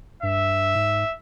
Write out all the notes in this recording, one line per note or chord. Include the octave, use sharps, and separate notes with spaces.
G2 E5
G#2